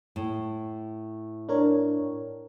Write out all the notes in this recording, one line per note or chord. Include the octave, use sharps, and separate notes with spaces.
A2
D4 A#4 C#5